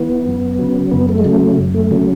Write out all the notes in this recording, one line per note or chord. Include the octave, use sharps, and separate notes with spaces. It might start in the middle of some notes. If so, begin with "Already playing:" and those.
Already playing: E3 B3
F#2
C#3 F#3
F#2 B3
A3
G#3
C#3 F#3 A3
A3
F#2
A3
C#3 F#3 A3